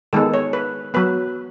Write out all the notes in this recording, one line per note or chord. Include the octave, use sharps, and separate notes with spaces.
D#3 G#3 B3 A4
C#5
B4
F#3 B3 B4